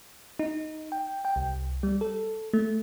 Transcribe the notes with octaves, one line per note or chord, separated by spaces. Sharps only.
D#4
G5
G5
C2
G3
A4
A3